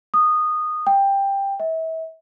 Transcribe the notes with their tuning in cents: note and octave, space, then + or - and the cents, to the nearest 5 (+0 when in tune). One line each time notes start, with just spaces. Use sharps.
D#6 -15
G5 +10
E5 -35